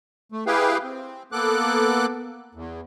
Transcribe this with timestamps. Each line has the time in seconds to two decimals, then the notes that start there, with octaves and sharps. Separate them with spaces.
0.32 A3
0.47 E4 G4 G#4 B4 F5 G5
0.83 C4
1.32 A#3 B3 A4 D6 F#6
2.55 E2